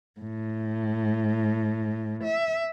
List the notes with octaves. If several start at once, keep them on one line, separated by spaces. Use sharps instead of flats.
A2
E5